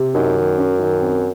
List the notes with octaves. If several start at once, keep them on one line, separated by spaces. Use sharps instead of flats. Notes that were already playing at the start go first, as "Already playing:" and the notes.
Already playing: C3
F#2 D#4
D#3
C#4
D#3
C4